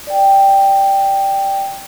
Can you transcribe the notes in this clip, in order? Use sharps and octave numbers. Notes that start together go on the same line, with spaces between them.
D5 G5